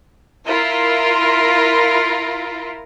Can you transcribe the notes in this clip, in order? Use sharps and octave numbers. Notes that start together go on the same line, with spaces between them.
E4 F4 A#4